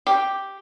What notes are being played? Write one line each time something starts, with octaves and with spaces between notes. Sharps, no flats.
G4